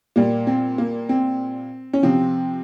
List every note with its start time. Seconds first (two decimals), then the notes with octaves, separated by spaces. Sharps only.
0.16 A#2 G3 A#3
0.47 C4
0.78 A#3
1.09 C4
1.93 C#4
2.03 C3 F3 C4